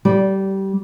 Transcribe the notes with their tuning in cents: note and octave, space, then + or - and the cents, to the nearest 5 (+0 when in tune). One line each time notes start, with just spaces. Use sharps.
G3 -20